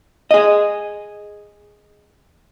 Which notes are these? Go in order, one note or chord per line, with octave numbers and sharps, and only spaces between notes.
G#4 D#5